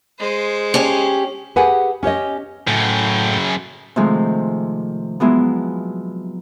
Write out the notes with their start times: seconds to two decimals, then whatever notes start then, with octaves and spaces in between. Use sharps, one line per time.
0.19 G#3 C5
0.74 C#4 G4
1.56 G4 G#4 B4 F#5 G#5
2.03 C#4 G4 C#5 D#5
2.67 F#2 A2 C#3 G5
3.96 C3 D#3 F3 G#3 A3
5.20 F3 F#3 G#3 B3 E4